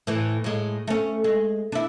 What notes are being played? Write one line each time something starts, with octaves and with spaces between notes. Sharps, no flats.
A2 E3
A2 G#3
A3 C#4
G#3
D4 E4